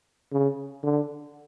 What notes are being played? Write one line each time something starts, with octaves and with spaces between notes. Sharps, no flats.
C#3
D3